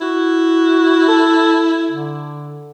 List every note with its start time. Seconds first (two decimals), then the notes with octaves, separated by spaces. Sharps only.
0.01 E4 F#4
1.08 A4
1.91 D3